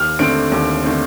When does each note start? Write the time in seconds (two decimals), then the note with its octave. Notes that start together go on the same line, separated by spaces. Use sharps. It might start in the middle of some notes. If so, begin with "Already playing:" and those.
Already playing: D#2 F6
0.19 D3 A3 C4 D7
0.52 D#2
0.84 D3 A3 C4